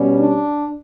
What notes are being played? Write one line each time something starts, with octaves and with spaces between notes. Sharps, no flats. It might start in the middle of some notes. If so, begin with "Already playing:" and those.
Already playing: B2 G3 C#4
D4